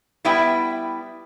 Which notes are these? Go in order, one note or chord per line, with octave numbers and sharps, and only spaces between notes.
G3 B3 E4 B4 E5 G5